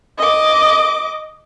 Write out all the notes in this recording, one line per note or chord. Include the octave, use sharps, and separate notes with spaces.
D#5 D6